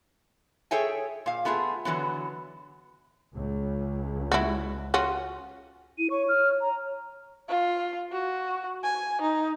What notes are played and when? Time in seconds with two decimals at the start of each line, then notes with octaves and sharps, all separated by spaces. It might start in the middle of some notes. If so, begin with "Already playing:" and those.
0.71 G#4 A4 C#5 E5 G5 G#5
1.26 A#2 F5
1.45 A3 B3 F4 F#4 G#4
1.85 D3 E3 F#3 B3
3.34 C#2
4.32 E4 F#4
4.94 C#4 F4 F#4
5.98 E4 D#7
6.10 C#5 C#6
6.29 F6
6.61 A#5
7.49 F4
8.12 F#4
8.84 G#5
9.22 D#4